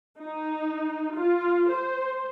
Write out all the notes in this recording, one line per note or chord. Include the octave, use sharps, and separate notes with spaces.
D#4
F4
C5